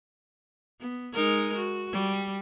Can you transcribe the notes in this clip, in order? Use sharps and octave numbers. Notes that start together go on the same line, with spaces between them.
B3
G#3 D#4 A#4
F#4
G3